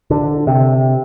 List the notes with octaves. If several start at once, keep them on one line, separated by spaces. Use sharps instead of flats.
D3
C3